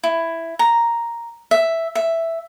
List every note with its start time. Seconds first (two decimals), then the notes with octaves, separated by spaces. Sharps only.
0.03 E4
0.59 A#5
1.51 E5
1.95 E5